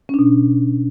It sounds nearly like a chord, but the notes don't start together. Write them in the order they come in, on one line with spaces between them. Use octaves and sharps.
C#4 D4 B2